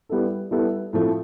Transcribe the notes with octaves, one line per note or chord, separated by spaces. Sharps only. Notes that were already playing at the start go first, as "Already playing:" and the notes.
G3 B3 E4 A4
G3 B3 E4 A4
A2 F3 A3 C4 F4